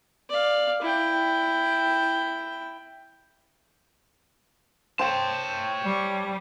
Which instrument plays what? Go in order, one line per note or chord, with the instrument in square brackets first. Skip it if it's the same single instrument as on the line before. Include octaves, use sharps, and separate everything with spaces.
[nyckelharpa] D5 F5
E4 G5
[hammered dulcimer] C5 G5 [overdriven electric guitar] C#5 A5
[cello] G3